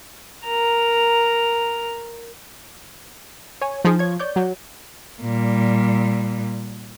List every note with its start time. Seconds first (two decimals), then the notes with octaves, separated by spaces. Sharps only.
0.45 A#4 A#5
3.61 C#5 G#5
3.85 F3 D#4 G#4
3.99 C#5 G#6
4.19 C#5 D5 G6
4.36 F#3
5.22 A#2 G3